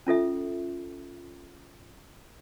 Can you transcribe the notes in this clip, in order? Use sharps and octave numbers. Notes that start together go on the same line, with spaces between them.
C#4 F4 A4 E5